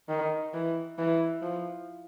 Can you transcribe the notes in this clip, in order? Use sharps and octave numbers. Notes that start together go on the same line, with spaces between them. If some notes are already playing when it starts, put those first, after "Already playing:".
D#3
E3
E3
F3